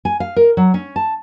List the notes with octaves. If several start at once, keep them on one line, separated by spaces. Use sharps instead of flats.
G#5
F5
A#4
F#3
C#4
A5